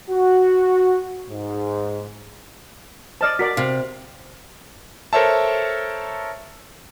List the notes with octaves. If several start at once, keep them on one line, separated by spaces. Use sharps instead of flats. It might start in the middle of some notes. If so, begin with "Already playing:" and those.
F#4
G#2
C5 D5 D#5 A5 F6
F#4 A#4 D5 B6
C3 F5
A4 A#4 C5 C#5 E5 A5